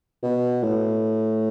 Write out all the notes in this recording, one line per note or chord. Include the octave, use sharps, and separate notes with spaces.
B2
A2